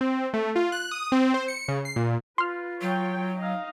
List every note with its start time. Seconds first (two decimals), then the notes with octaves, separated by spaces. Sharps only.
0.01 C4
0.34 A3
0.56 F4
0.72 F#6
0.91 D#6
1.12 C4
1.34 C5
1.48 C#7
1.68 C#3
1.85 C7
1.96 A#2
2.38 F4 B4 C6 F6
2.81 F#3 C#5 G5
3.35 D#4 D#5 F5